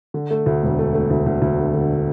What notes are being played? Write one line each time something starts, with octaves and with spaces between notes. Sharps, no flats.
D3
A3
D2
E1
A3
A3
D2
D2
D2
D3
D3